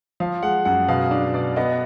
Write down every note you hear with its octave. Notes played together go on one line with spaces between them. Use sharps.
F3 F5
G#3 F#5
F#2 F#5
B2 F5
D4
B2 D5
B3 D#5